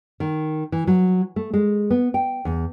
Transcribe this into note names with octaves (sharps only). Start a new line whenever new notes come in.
D#3
E3
F#3
A3
G#3
B3
G5
E2